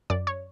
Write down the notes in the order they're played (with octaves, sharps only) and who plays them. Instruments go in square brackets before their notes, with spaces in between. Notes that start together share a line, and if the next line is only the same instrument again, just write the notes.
[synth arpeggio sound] F#2 D5
C#5